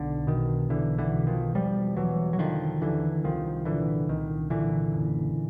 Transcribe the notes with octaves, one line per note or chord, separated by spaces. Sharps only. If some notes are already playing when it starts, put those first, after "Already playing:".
Already playing: B1 D3
B2 D#3
B1 D3 E3
D3 E3
B2
D#3 F3
E1 F3 G3
E1 E3 F#3
F#3
D3 D#3 F3
D#2 D3 E3
C2 D#3 F3
A#2 D3 E3
C2 D#3
A#2 D3 E3
F#1